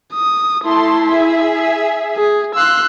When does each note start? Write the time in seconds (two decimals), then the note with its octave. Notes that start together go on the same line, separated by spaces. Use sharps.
0.14 D#6
0.65 A3 E4 A5 C6
1.10 G#4 E5
2.17 G#4
2.55 F5 C6 E6 F#6